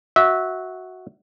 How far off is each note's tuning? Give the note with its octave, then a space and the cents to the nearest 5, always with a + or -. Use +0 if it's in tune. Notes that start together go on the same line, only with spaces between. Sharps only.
F#4 +0 E5 -20